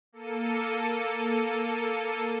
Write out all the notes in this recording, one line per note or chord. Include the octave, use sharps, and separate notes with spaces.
A#3 A4 C#7 D#7